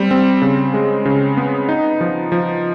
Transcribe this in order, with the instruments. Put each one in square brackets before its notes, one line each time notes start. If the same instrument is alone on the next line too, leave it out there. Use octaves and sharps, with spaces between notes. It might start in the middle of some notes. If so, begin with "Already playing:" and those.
Already playing: [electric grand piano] G3 C4
C4
C#3
G#3
C#3
B3
D#4
F3
F3